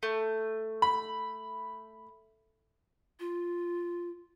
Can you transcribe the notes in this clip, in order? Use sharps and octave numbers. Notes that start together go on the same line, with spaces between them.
A3
B5
F4